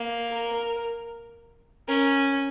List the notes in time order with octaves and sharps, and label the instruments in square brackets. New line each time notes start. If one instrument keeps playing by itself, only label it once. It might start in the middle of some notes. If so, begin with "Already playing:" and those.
Already playing: [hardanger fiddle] A#3
[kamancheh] A#4
[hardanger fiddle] C#4 [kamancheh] A#4